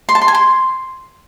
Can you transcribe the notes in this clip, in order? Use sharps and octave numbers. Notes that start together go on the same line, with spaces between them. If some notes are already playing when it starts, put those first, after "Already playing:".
C6
A5
C6
G#5
C6